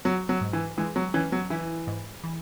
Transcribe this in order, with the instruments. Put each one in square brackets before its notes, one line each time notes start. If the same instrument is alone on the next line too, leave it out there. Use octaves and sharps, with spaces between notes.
[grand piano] F#3 [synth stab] F#4
[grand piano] F#3
[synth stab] G#2
[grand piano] E3
[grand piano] E3 [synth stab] G#3
[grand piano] F#3
[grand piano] E3 [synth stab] C#4
[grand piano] F#3
[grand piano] E3 [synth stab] E4
[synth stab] G#2
E3